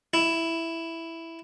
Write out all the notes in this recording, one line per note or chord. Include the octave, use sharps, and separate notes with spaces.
E4